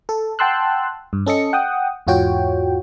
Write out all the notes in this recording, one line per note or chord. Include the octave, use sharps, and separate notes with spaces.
A4
F#5 G5 A5 C6 E6 F#6
G2
C#4 A4 D#5 C#7
F#5 G5 D#6
E2 G#2 F4 F#4 C#5 G5